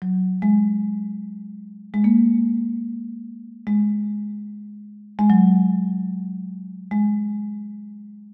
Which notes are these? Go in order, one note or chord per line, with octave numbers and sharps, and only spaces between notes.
F#3
G#3
G#3
A#3
G#3
G#3
F#3
G#3